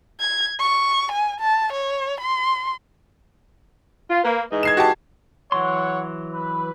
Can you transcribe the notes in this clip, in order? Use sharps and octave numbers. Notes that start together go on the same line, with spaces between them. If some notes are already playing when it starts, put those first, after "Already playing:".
G#6
C#6
G#5
A5
C#5
C6
F4
A#3 B4
G#2 E3 D#5
G#6 C7 E7
F#4 G4 A5
E3 F#3 C#5 F#5 C6
B4